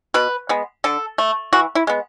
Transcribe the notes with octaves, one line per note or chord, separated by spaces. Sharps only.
B2 B4
G#3 B3
D3 A4
A3
E3 F#4
E4
G#3 B3